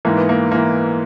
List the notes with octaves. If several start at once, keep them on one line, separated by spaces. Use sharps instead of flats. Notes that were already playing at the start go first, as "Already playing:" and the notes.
G#2 E3 A#3
B3
A#3
E3 A#3